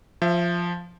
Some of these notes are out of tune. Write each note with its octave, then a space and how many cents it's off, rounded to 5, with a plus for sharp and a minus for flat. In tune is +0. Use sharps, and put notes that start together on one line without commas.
F3 +0 E5 +35